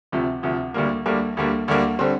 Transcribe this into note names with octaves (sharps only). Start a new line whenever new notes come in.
D2 C3 F3
D2 C3 F3
D2 D3 G3 A#3
D2 D3 G3 A#3
D2 D3 G3 A#3
D2 D3 G3 A#3
D3 G3 C4